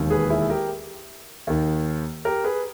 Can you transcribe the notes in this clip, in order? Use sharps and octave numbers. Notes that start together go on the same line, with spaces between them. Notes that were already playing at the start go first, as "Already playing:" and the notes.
Already playing: E1 D#2 D#3
G#4 B4
E4 G#4
G4 A#4
D#2 D#3
G4 A#4
G#4 B4